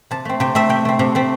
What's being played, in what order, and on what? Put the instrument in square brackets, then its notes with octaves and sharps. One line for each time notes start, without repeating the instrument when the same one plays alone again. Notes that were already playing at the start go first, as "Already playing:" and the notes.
[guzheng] C3 A5
A3 C4
C3 G5
A3 C4 E5
C3 G5
A3 C4
C3
A3 C4